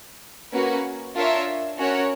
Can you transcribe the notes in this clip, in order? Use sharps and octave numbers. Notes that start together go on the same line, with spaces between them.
A#3 C#4 F#4 B4
D4 F4 A#4 C#5 E5
C#4 F#4 A#4 C#5 F#5